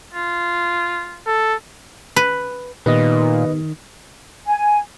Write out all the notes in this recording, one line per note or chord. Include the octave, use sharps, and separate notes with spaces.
F4
A4
B4
A#2 D#3 B3 D#4 G4 B4 D#5
G#5